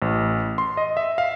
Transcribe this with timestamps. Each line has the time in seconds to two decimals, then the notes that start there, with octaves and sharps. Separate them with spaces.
0.02 A1
0.58 C6
0.77 D#5
0.97 E5
1.18 F5